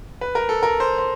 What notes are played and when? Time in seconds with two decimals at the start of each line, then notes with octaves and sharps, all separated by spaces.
0.21 B4
0.35 A#4
0.49 A4
0.63 A#4
0.80 C5
0.98 C5